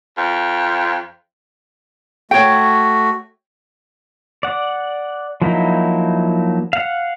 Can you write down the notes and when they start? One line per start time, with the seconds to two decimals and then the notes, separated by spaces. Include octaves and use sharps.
0.18 F2
2.31 A3 F#4 C#5 G5
4.43 D5 F#5
5.42 F3 F#3 A#3 D#4 E4
6.73 F5 F#5